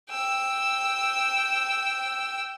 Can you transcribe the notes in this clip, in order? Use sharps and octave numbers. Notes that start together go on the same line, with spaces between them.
G5 E6